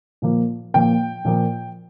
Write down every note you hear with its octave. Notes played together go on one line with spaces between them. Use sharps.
A#2 F3 A#3
A#2 F3 A#3 G5
A#2 F3 A#3